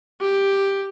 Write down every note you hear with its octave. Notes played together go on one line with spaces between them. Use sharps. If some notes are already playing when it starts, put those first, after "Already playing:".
G4